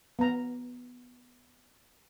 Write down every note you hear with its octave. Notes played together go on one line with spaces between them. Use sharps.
B3 A#5